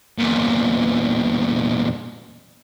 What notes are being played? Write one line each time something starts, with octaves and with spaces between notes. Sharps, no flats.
E2 A#2